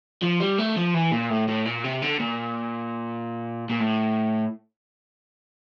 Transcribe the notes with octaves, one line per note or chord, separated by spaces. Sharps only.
F3
G3
A3
F3
E3
A#2
A2
A2
A#2
C3
D3
A#2
A#2
A2